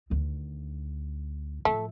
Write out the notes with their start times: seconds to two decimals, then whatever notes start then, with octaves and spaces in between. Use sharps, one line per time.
0.10 D2 D#3
1.65 A2 F3 A3